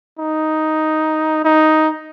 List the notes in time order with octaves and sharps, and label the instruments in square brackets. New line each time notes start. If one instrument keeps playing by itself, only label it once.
[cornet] D#4
D#4